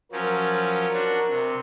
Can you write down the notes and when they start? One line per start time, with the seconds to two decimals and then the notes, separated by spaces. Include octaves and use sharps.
0.12 F3 F#3 C#4 A#4
0.93 D4 F#4
1.29 C3